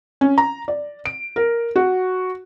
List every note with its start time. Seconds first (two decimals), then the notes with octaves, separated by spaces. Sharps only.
0.21 C#4
0.38 A#5
0.68 D5
1.06 D7
1.36 A#4
1.76 F#4